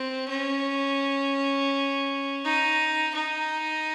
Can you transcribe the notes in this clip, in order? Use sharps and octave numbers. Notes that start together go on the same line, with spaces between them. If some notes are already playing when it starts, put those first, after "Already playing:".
Already playing: C4
C#4
D#4
D#4